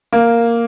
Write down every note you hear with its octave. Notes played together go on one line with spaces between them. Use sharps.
A#3